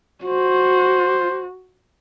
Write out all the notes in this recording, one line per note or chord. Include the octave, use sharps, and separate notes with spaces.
F#4 C5